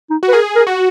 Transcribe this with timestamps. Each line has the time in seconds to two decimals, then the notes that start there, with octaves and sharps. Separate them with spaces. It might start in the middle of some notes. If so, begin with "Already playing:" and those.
0.10 D#4
0.23 F#4
0.28 B4
0.33 G#4 A#4
0.56 A#4
0.67 F#4